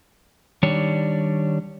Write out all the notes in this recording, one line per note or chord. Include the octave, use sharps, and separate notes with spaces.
D#3 G3 D4 C#5